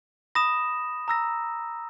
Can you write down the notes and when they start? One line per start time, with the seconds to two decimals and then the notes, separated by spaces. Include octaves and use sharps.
0.35 B5 D#6 A#6 E7
1.08 A#5 E6 A#6